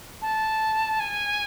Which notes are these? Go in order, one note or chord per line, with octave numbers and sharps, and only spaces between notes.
A5
G#5